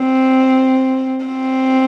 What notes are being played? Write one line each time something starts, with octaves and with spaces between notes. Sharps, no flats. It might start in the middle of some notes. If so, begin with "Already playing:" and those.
Already playing: C4
C4